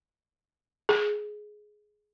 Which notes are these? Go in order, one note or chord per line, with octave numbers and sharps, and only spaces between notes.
G#4